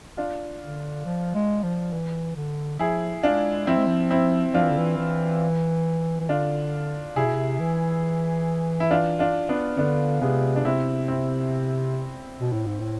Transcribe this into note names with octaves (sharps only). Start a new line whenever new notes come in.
D4 F4
D3
F3
G#3
F3
E3
D3
F3 E4 G#4
G#3 D4 F4
F3 C4 E4
G#3
F3
C4 E4
F3 D4 F4
E3
D3
E3
E3
E3
D3 D4 F4
C3 E4 G#4
B2
C3
E3
E4
D4 F4
D4 F4
B3 D4
D3 B3 D4
C3 G#3 B3
D4
C3 C4 E4
C4 E4
B2
A2
G#2
A2